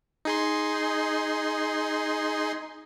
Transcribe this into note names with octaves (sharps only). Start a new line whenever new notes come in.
D#4 G#4 C6